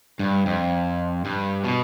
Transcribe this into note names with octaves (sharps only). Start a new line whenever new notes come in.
G2
F2
G2
B2